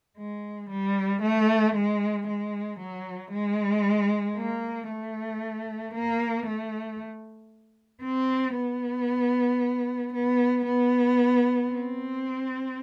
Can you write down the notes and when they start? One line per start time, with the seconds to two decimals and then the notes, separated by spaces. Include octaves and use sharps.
0.18 G#3
0.70 G3
1.22 A3
1.75 G#3
2.27 G#3
2.79 F#3
3.32 G#3
4.37 A#3
4.89 A3
5.94 A#3
6.46 A3
8.04 C4
8.56 B3
10.13 B3
10.65 B3
11.70 C4